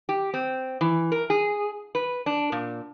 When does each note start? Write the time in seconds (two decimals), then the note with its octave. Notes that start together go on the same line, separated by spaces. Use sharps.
0.09 G4
0.34 C4
0.81 E3
1.12 A#4
1.30 G#4
1.95 B4
2.26 D4
2.52 A#2